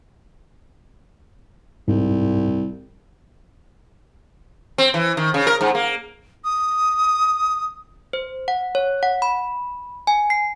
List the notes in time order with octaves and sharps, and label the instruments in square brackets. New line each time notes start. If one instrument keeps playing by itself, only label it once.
[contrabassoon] C2 [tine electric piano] G#2
[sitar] C4
E3
D#3
C#3
A#4
G#2
A#3
[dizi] D#6
[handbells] C5
F#5
C#5
F#5
B5
G#5
C7